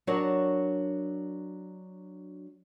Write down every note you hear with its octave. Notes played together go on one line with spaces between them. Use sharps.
F#3 D4 F#4 A#4 C#5 A5